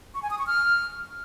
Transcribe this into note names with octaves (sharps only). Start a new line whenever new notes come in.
C#6
G#5
D#6
C#6
F6